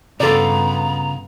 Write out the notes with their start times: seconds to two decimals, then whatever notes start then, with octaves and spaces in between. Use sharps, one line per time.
0.20 G2 C#3 B3 F4 A4 D5 A#5